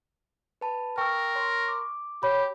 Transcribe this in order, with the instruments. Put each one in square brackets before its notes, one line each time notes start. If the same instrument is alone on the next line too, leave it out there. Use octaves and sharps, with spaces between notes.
[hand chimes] B4 A5 B5
[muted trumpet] A#4 [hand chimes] G5 E6 [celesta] C#6
[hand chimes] C#5 C6
D6
[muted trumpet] G4 [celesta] C#5 B5